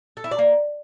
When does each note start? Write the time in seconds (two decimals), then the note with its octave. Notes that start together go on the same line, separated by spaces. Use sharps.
0.17 A4
0.24 E4
0.31 D5
0.39 A#3